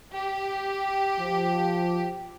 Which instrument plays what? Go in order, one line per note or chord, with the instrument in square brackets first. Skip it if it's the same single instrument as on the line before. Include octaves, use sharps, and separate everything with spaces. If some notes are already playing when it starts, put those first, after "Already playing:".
[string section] G4
[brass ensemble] F3